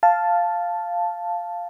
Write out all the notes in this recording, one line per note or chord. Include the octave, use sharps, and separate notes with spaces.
F5 A5